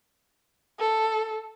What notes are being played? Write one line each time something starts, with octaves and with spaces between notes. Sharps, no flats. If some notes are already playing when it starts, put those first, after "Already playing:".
A4